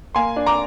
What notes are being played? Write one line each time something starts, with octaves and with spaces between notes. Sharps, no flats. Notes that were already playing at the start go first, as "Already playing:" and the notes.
A#3 G#5 C6
D4
A#5 D6